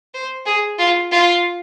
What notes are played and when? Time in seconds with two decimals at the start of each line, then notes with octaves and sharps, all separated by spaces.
0.14 C5
0.46 G#4
0.79 F4
1.12 F4